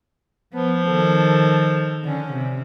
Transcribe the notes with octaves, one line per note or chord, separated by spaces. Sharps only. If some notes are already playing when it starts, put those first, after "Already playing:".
F3 B3
D#3 A4
D3 C#4
C3